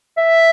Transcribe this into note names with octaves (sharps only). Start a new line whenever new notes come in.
E5